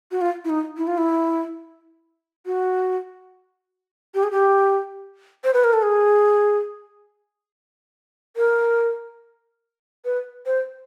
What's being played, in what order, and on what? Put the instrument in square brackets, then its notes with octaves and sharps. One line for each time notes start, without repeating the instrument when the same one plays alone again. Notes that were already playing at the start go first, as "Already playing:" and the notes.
[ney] F#4
F4
E4
D#4
E4
F4
E4
F#4
G4
G#4
G4
C5
B4
A#4
A4
G#4
A#4
B4
C5